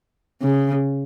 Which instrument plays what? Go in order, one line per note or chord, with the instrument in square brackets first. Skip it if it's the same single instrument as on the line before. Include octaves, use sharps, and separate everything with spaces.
[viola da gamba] C#3